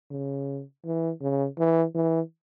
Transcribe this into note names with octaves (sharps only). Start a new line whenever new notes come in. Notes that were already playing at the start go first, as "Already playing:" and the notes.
C#3
E3
C#3
E3
E3